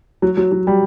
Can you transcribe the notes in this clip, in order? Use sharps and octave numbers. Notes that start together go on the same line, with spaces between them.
F#3
F#3
F#3
G3